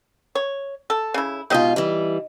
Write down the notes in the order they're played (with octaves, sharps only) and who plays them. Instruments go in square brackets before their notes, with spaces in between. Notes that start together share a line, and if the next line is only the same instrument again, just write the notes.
[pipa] C#5
A4
C#3 E4
[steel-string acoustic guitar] G#2 B2 F4 [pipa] D#4 G4 D#5
[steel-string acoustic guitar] E3 G3